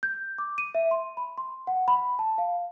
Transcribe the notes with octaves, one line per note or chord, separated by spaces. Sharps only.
G6
D6
D#7
E5
C6
B5
C6
F#5
B5
A5
F5